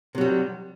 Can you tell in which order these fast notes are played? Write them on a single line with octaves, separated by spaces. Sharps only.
C3 F#3 G3